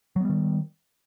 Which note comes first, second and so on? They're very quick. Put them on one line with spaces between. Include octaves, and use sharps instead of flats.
F#3 B3 G3 D#3